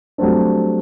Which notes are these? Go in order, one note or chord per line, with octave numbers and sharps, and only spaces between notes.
F#3 G3 A3 C4 D4